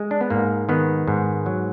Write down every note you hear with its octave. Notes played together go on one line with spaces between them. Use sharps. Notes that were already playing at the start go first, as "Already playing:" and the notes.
Already playing: G#3
D4
B3
G#2 A#3
D#3 B3
G#2
F#3